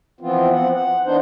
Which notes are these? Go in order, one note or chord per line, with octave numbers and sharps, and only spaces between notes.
E3 F3 B3 C4 F4
F3 C4 F#5
F#5
E3 B3 D4 D#4 C5